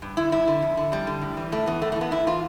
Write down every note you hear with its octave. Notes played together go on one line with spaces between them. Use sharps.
G2
D3 E4
G2 E4
D3
F2
D3
F2 G3
D3
A2
E3
A2 A3
E3 B3
A2 A3
A3
E3
B3
A2 E4
E3 F4